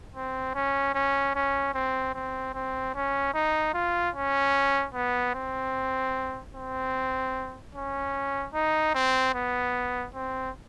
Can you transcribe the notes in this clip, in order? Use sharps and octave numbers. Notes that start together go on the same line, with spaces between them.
C4
C#4
C#4
C#4
C4
C4
C4
C#4
D#4
F4
C#4
B3
C4
C4
C#4
D#4
C4
B3
C4